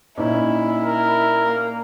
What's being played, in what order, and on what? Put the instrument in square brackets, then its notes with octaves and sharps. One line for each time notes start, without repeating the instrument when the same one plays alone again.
[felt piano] A#2 C#4 D#4 [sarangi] E4
[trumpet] A#4
[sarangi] A#3